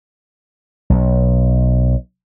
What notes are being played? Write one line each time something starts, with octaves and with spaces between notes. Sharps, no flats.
B1